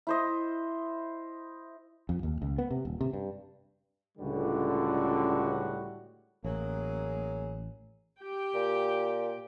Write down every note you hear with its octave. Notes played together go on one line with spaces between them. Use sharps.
E4 C5 D#5
F2
D#2
C#2
B3
C3
D#1
C3
G2
C#2 A2 D3 G3 F#4
A1 F#3 A#3 G#4
G4 G5
A#2